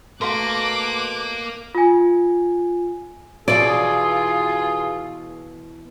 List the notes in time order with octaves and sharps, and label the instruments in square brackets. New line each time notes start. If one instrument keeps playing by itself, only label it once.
[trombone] B2 [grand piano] A3 C6 [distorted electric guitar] A#4 F5 [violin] D6 F#6
[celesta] F4 G#5
[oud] B2 E3 [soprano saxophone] F4 [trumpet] G#4 [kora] D5